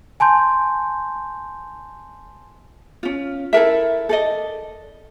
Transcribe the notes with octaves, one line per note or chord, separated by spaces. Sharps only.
G#5 A5 C6 G6
C#4 F4
E4 A4 A#4 E5
A4 D5 D#5